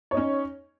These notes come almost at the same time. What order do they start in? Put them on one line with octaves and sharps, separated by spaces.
C#5 D#4 C#4